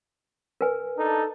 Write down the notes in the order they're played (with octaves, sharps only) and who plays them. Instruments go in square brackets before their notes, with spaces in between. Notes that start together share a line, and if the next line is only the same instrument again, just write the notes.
[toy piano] A#4 B4 G#5
[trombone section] D4 D#4 A4